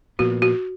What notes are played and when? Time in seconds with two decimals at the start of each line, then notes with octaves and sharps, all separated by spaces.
0.19 A#2 F3 B3 F#4
0.42 F#4